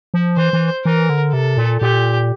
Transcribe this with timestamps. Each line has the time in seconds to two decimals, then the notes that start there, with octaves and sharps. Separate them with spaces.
0.14 F3
0.37 E3 C5
0.53 E3
0.85 E3 A#4
1.10 D3
1.33 C3 A4
1.57 A#2
1.81 A#2 G4